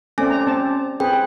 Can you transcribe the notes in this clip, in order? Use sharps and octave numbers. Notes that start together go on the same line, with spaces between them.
A3 C4 C#4 D5 G#5
A#5
C4 D5 A5
C4 G#4 B4 G5